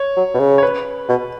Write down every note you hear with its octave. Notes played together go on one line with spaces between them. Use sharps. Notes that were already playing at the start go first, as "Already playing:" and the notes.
Already playing: C#5
F#3
B2
C#3
C#5
B4
B2